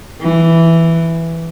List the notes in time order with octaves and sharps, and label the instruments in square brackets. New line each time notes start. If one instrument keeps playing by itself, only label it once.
[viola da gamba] E3